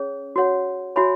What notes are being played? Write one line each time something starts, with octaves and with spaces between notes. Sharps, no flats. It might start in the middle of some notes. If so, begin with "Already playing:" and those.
Already playing: C#4 G#4 C#5
F#4 C#5 F#5
F#4 C#5 E5 G#5 B5